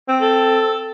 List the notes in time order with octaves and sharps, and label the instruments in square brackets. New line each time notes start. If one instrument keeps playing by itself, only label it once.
[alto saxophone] C4
[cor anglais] A4